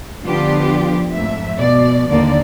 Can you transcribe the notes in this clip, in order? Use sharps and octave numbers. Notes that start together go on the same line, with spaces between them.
D3 F3 B3 D4 F4 G4
F2 G#2 A3 E5
B2 D5
D#2 D3 A#3 D5